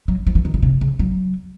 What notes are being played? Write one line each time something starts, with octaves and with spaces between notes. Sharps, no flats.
F#3
F3
E3
D#3
C#3
C3
C#3
F#3